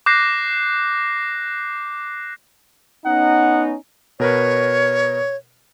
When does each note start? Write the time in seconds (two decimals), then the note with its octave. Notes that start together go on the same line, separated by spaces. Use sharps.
0.06 D6 F#6 G6 A#6 C7
3.06 B3 C#4 D#4 F#5
4.20 B2 A#4 B4 C#5